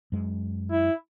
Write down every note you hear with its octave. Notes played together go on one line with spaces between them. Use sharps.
F#2 G#3
E4